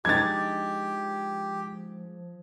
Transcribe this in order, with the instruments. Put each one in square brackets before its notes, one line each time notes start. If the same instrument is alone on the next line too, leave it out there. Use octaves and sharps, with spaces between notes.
[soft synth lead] F3 [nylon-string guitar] G#3 D4 D#4 [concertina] G4 [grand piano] G#6 A6